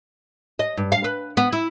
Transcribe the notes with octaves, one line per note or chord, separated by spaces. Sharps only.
D#5
G2
F5
B4
B3
E4